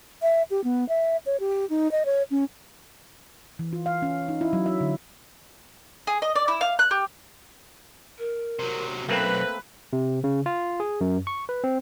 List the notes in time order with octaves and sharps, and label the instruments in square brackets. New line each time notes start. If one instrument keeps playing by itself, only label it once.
[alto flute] E5
G4
B3
E5
C#5
G4
D#4
D#5
C#5
C#4
[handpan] E3
F4
F5
C#4
D#4
E4
F#3
E5
D3
[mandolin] G#4
D#5
D5
E4
F5
F#6
G4
[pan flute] A#4
[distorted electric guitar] C3 F#3
[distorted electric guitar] B1 F#2 [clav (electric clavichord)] A3 A#3 C4 [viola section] B4 [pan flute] C5
[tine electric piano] C3
C#3
F4
G#4
F#2
C#6
B4
C4